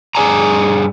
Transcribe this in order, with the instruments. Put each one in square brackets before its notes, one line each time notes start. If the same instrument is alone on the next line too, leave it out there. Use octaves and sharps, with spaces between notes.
[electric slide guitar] G2 G#4 D5 G#5 A#5